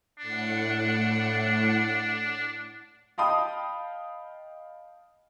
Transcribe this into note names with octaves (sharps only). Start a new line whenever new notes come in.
A2 D4 F#5 C#7
D#5 F5 G5 A5 B5 D#6